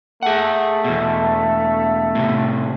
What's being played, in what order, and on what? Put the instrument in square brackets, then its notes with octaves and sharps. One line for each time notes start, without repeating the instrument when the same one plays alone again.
[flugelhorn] A3 [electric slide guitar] G#4 F#5
[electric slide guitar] E2 B2
A2 C3